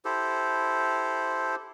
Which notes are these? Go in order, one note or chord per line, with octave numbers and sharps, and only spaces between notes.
E4 G4 A4 C5